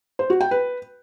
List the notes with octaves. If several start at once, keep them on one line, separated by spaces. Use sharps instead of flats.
C5
F#4
G5
B4